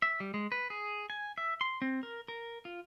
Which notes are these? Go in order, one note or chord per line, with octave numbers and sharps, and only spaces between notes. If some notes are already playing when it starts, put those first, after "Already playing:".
E5
G3
G#3
B4
G#4
G#5
E5
C6
C4
A#4
A#4
F4